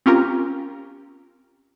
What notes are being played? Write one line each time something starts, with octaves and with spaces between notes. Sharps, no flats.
C4 C#4 F4 G4 A#4